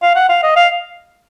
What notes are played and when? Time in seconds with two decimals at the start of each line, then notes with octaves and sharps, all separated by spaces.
0.02 F5
0.15 F#5
0.29 F5
0.43 D#5
0.56 F5